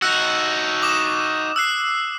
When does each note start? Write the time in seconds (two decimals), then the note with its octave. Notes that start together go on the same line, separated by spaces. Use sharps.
0.02 D#4 F#4 E6 F#6
0.82 D6 D#6 E7
1.56 E6 F#6 C7